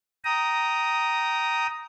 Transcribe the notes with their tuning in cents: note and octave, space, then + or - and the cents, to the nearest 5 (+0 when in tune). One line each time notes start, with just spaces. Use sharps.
G5 -20 A#5 +0 D#6 +5